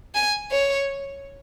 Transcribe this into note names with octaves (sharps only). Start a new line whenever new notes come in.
G#5
C#5